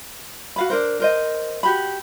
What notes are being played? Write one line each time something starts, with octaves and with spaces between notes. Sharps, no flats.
F#4 F5 B5
D4 A#4 C5
A#4 C5 D#5
F#4 G4 B5